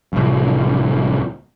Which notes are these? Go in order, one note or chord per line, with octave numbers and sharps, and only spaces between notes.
D1 C2